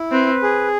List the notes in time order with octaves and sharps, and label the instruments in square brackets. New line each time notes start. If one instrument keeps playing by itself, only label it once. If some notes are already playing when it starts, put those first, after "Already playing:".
Already playing: [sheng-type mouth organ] E4
[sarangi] C4 [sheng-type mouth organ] B4
[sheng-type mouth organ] G#4